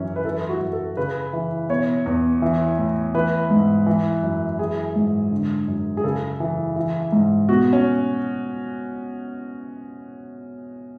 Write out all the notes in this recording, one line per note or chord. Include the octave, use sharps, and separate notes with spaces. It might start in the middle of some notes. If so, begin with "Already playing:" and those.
Already playing: F#2 E3 C#4
B4
E3 A4
F#4
F#2
A4
C#3 B4
E3
B2 C#5
E2
E3
A2
E3 B4
G#2
E3
F#2
E3 G#4
G#2
D3
F#2
G#4
C#3 A4
E3
E3
G#2
B2 F#4
C#4